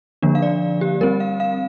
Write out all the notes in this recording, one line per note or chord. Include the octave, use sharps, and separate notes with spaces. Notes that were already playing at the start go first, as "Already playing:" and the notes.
D3 F3 A#3 D4
F5
D5
G4
G3 C4 A#4
F5
F5